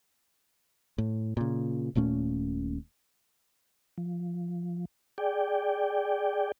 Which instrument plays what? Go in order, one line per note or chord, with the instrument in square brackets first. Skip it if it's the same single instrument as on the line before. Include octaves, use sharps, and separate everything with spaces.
[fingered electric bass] A2
A#2 C#3
D#1 A#2 A3 C#4
[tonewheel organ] F3
G#4 D5 G5